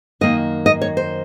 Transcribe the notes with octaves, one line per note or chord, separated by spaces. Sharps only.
F#2 D#3 A#3 D#5
D#5
C#5
C5